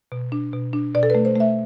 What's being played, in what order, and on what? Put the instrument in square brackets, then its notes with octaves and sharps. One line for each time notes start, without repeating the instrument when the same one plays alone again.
[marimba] B2
D4
B2
D4
B2 D5
A4
A3 B4
C5
A3 E5